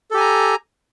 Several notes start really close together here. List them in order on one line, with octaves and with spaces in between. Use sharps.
A4 G4 G#5 A#5